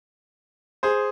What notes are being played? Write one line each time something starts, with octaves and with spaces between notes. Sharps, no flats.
G#4 C5